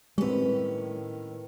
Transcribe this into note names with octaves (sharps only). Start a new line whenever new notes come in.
A2 D#3 G3 G#3 C4 C#4 B4